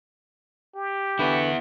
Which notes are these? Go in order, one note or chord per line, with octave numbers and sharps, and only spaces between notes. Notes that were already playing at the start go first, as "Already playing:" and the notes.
G4
D3 B3 E4 B4 C#6